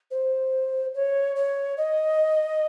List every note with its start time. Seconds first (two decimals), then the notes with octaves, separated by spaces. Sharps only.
0.10 C5
0.94 C#5
1.35 C#5
1.77 D#5